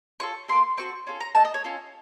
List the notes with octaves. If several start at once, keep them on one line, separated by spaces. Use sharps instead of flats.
C#4 F4 A4 C#6
A#3 F4 A4 C6
C4 F#4 A4 C#6
C#4 F4 A4
A#5
A3 D#4 A4 A5
D#5
C#5
C#4 F4 A4